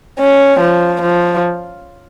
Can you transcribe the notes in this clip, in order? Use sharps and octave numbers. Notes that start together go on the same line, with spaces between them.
C#4
F3
F3